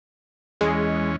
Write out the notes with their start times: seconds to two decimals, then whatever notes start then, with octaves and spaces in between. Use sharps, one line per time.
0.61 E2 G#3 C#4